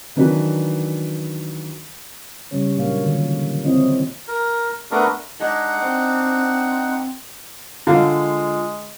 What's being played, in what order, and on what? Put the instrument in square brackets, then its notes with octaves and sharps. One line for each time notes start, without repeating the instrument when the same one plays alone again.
[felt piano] D#3 E3 F#3 D4 B4
[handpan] C#3 G3 C#4 C#5
A#2 F#3 A#3 D4 C#5 F5
D3 D#3 F3 A#3
E3 F3 C4 E4 C#5 D#5
[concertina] A#4
A3 B3 D4 A#4
[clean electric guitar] G#3 [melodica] D4 D#4 F#5
[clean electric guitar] C4
[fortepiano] D3 F5 [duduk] G#3 [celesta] F4